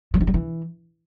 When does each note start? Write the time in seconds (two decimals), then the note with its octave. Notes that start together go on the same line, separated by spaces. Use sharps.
0.14 F3
0.21 D#3
0.27 G3
0.34 E3